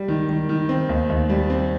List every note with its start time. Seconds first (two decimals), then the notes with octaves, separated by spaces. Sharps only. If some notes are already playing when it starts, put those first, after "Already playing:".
Already playing: G3
0.08 D#3
0.29 D#3
0.49 D#3
0.69 C4
0.89 D#2
1.09 D#2
1.30 G3
1.50 C4